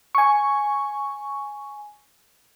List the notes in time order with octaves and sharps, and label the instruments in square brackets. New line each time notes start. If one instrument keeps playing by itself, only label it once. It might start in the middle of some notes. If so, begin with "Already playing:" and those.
[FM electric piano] G#5 C#6